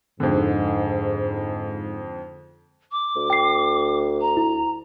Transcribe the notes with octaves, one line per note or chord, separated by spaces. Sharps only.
F2 G#2 D3
D6
D2
G5 C7
A#5
E4